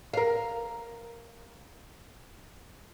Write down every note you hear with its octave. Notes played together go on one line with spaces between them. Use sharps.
A#4 F5